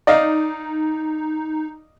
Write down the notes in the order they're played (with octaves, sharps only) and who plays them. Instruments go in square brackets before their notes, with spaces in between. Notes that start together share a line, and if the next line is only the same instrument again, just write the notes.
[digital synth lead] D#4 [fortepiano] D5 D#5 F5